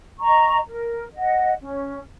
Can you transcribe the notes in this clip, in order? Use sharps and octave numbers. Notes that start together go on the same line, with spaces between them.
D#5 A#5 C#6
A#4
D#5 F#5
C#4